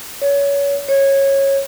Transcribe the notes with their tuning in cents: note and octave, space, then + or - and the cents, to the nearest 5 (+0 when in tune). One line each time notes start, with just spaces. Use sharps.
C#5 +25
C#5 -15